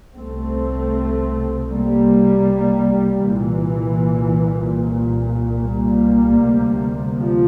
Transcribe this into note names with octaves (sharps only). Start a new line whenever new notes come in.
C2 C3 A3 C4
G3 A#3
C2 A#2 E3
G3 A#3
D2 C3
F3